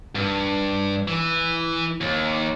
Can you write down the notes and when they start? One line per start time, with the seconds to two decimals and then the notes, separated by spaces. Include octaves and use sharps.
0.15 G2
1.08 E3
2.01 D#2